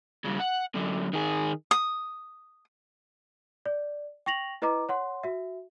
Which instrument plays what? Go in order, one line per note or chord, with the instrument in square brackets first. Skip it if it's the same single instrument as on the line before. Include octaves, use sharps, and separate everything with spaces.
[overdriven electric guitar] G2 C#3
F#5
F#2 D3
D#3 G#4
[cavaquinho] D#6
[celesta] D5
G5 C#6 A#6 F7 F#7
E4 B4 D#5 A#5 D6
C#5 F#5 C6
F#4 E5